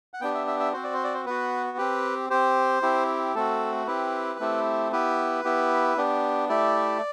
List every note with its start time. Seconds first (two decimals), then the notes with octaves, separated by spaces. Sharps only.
0.14 F#5
0.21 B3 D4 G4 G5
0.34 E5
0.47 E5
0.60 E5
0.73 C4 F#4 C5
0.84 D5
0.94 C5
1.04 D5
1.14 C5
1.26 B3 F#4 B4
1.78 C4 G4 B4
2.30 C4 G4 C5
2.82 C4 E4 G4
3.35 A3 C4 F#4 A4
3.87 C4 E4 G4 B4
4.40 A3 C4 E4 G4
4.92 B3 E4 G4 B4
5.44 B3 E4 G4
5.97 B3 D4 G4
6.49 A3 E4 G4 D5